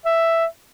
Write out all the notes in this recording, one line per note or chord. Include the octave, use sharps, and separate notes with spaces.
E5